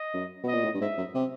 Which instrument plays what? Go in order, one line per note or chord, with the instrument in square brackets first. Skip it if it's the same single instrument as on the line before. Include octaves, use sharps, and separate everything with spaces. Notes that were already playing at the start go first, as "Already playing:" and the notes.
Already playing: [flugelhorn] D#5
[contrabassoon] F#2
[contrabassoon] B2 [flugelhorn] D#5
[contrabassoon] A#2
A2
G2
[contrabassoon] G#2 [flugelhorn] E5
[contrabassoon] F#2
C3